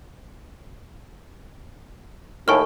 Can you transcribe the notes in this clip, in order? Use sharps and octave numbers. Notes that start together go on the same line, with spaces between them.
D#2 A2 G#5 C#6 F6